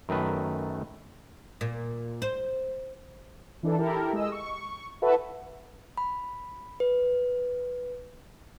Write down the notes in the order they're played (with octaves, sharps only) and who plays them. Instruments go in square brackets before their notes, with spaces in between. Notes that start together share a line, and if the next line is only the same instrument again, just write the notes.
[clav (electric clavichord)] F#2 D#3 A3 B4
[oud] A#2
C5
[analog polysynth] E3 D4 D#4 A4
E4 G4 A4 A#4
G#3 D#5 E6
C#6
E4 F#4 A4 B4 E5 F#5
[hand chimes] B5
B4